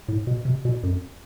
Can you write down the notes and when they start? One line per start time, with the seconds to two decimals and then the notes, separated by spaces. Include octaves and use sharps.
0.08 A2
0.27 B2
0.45 C3
0.65 B2
0.83 F#2